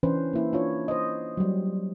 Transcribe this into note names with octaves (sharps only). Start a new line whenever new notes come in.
E3 C#4 D4 B4 C5
A#3 E4
D4 F4 C#5
C5 D#5
F#3 G3